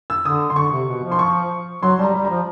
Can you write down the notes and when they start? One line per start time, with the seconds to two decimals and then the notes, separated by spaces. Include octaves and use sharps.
0.10 E6
0.25 D3 D#6
0.50 C6
0.56 D3 C#6
0.72 C3
0.89 B2
1.04 F3
1.12 C6
1.19 C#6
1.82 F#3 C6
1.99 G3 A5
2.04 A#5
2.14 G3 B5
2.25 A#5
2.30 F3